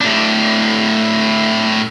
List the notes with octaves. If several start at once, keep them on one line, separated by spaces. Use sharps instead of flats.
A2 D4